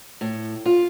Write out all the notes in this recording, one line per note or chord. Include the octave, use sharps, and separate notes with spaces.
A2
F4